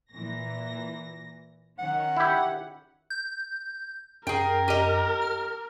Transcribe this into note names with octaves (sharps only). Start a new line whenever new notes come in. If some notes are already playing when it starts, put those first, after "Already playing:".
A#2 E3 A#6
D#3 C#4 F#5
E4 G4
G6
F#2 G#4 A#4 G5
G4 D#5
F6